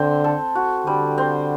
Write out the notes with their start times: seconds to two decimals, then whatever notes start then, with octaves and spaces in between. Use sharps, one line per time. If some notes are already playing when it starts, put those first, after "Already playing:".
Already playing: D3 C4
0.24 A4
0.55 F#4
0.86 D3 G3
1.18 C4